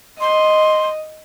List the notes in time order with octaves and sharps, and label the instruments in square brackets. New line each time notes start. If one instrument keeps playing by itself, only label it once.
[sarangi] D#5 [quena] C6